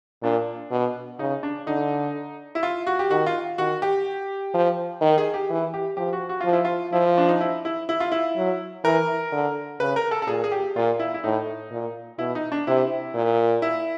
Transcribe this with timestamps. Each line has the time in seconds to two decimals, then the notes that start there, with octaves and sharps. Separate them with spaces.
0.23 A#2 D4
0.71 B2
1.19 C#3 D#4
1.43 D4
1.67 D3 D#4
2.55 E4
2.63 F4
2.87 F#4
2.99 G4
3.10 D#3 F#4
3.26 F4
3.58 D#3 F#4
3.82 G4
4.54 F3
5.01 D#3
5.18 G#4
5.34 G4
5.49 E3
5.74 G4
5.97 F3 G4
6.13 F#4
6.29 F#4
6.41 F3 F4
6.53 E4
6.65 F4
6.92 F3 E4
7.18 D4
7.28 D#4
7.41 E4
7.65 E4
7.89 E4
8.00 F4
8.12 E4
8.37 F#3
8.84 E3 A#4
9.32 D3
9.79 C#3 B4
9.96 A#4
10.11 A4
10.22 A4
10.27 A#2 G#4
10.44 G#4
10.52 G4
10.76 A#2 F4
10.99 E4
11.14 E4
11.24 A2 D#4
11.72 A#2
12.19 B2 E4
12.35 D#4
12.52 D4
12.67 C3 E4
13.15 A#2
13.62 E4